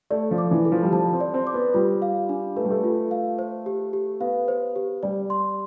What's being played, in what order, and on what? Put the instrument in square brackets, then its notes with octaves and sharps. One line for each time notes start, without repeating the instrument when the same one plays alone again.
[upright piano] A3 [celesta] D5
[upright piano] F3
[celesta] D6
[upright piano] E3
[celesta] A4
[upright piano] F3
G3
[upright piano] F3 [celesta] A5
[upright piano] C4
[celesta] D5
[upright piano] C4
[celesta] D6
[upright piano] B3
[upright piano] G3 [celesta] F4
[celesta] F5
D4
[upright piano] A3 [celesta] B4
[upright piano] G3
A3
[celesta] F4
F5
C5
G4
G4
[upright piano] B3 [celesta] F5
[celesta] C5
G4
[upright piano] G3 [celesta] D5
[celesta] C6